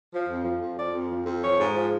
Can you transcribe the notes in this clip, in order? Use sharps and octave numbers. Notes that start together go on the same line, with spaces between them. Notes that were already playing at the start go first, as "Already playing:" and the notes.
F3
F2
F3
F2
F3 D5
F2
F3
F2
F3 C#5
G#2
F3